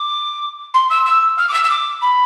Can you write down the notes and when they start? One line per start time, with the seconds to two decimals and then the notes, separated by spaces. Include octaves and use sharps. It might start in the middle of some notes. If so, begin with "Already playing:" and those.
Already playing: D6
0.74 C6
0.90 E6
1.06 E6
1.37 F6
1.49 D6
1.53 E6
1.64 E6
1.70 D6
2.02 B5